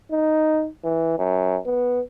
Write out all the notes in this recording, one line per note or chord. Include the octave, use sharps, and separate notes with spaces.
D#4
E3
F#2
B3